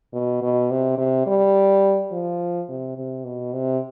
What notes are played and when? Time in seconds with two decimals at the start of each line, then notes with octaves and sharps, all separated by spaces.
0.13 B2
0.42 B2
0.71 C3
0.98 C3
1.26 G3
2.12 F3
2.69 C3
2.97 C3
3.25 B2
3.53 C3